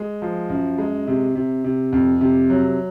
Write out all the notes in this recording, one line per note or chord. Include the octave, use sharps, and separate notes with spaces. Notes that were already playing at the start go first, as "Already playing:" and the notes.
Already playing: G#3
F3
F#2
G#3
C3
C3
C3
F2
C3
F#3